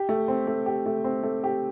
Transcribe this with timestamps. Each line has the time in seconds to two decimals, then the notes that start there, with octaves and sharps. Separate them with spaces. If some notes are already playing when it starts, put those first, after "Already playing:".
Already playing: G4
0.09 A3
0.28 C4
0.47 A3
0.66 G4
0.86 A3
1.04 C4
1.23 A3
1.44 G4